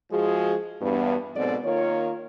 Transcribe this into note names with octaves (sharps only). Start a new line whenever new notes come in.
F3 G#3 F#4 G#4
E2 G2 B3
G#2 B2 F#3 C4 A4 D5
D#3 A#3 F4 C#5